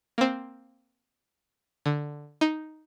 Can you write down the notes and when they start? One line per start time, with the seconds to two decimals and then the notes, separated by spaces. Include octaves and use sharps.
0.18 A#3 C4
1.86 D3
2.41 D#4